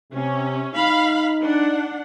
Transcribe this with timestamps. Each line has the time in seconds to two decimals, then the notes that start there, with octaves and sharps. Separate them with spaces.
0.13 C3 C#4
0.75 D#4 F5 B5
1.39 D4 F#5